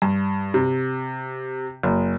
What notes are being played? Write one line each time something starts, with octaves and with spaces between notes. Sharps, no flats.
G2
C3
F#1